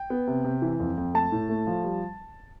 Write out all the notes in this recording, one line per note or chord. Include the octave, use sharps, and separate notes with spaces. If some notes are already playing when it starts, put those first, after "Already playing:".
Already playing: G5
B3
C3
C3
E3
F2
F2
A3 A5
A2
A3
F3
G3